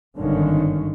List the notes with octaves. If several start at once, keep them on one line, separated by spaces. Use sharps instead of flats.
G#1 G2 D3 D#3 C#4